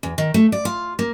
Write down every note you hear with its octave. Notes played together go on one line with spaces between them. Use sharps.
E2
D#3
A3
D5
F4
A#3